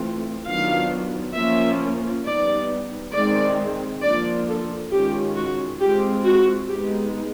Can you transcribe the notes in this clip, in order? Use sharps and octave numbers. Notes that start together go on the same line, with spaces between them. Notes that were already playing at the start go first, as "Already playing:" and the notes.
Already playing: E3 A3 C4 F4
D#3 F#3 B3 D4 F4 F5
F3 A#3 C#4 F4 E5
G3 B3 D#4 D5
D#3 G#3 C4 D5
F3 A#3 D4 F4 D5
A4
D#3 G#3 C#4 F4 G4
F#4
G#3 C4 F4 G4
F#4
G#3 B3 D#4 G4